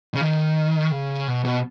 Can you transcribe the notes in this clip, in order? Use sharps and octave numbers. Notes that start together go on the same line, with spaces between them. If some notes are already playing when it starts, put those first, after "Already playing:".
C#3
D#3
C#3
B2
B2